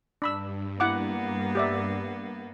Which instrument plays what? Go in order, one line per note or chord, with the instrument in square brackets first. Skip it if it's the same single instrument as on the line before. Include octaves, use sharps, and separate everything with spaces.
[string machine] G2 [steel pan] D4 B5 E6
[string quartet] A#3 B3 [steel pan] E4 F#5 D6
[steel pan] G4 D5 E5